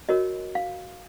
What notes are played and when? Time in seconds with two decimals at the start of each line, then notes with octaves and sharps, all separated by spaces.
0.09 F#4 A#4 C#5 D#5
0.55 F5